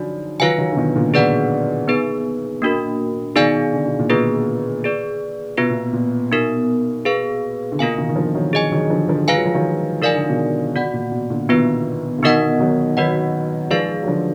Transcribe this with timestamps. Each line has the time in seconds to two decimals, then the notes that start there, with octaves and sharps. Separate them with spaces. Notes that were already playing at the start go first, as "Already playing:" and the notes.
Already playing: D3 F3 F#3 D#4 F#4 D5
0.40 D#3 F#3 F4 B4 F5 G#5
0.58 D#3 F#3
0.72 D3
0.77 B2 D#3
0.96 A#2 D3
1.14 B2 D#3 G#4 B4 D5 F#5
1.88 B3 D#4 G#4 B4
2.62 A#3 D4 F#4 A#4
3.36 B2 D#3 D#4 G#4 D5 F5 G#5
3.73 D3
3.86 B2
3.99 A#2
4.10 B2 A#3 F4 G#4 B4
4.84 G#4 B4 D5
5.57 B2 B3 F4 B4
5.70 A#2
5.93 A#2
6.31 B2 B3 D#4 A#4
7.05 G#4 B4 F5
7.72 D3
7.79 B2 A#3 F4 A#4 F5 G#5
7.98 B2 D#3
8.09 D#3
8.16 D3 F3
8.35 D#3 F#3
8.53 G#4 D#5 G#5
8.72 D#3 F#3
8.90 D3 F3
9.08 D3 F3
9.27 G#3 F4 B4 F5 G#5
9.36 F#3
9.45 F3
9.54 D#3 F#3
10.02 D#3 D#4 A#4 D5 F5 G#5
10.15 D3
10.29 B2 D#3
10.75 B2 F#4 D5 F#5
10.94 A#2
11.12 B2
11.30 A#2 D3
11.49 B2 D#3 B3 F4 B4
12.19 D3
12.23 B2 D#3 B3 D#4 A#4 D#5 F#5
12.59 D#3 F#3
12.97 D#3 F#3 F#4 B4 D#5 F#5
13.71 F3 G#3 D#4 G#4 B4 D5 F5
14.03 F#3
14.07 D3 F3